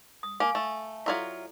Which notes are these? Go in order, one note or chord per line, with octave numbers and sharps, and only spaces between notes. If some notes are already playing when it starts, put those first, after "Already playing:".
D#6
A#3 F5 G#5
A3
F#3 E4 F4 A4 D5 E5